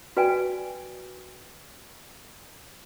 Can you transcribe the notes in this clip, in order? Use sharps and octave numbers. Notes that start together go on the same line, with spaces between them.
F#4 B4 D5 G5 G#5